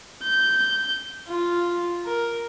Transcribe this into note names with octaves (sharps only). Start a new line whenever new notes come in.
G6
F4
A#4